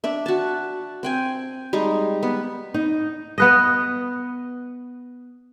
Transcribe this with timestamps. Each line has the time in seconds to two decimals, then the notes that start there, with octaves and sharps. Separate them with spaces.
0.04 D4 D5 E5
0.26 F#4 A5
1.03 C4 G5 G#5
1.73 G3 G#3 D#4
2.23 B3
2.74 D#4
3.38 B3 B4 D#5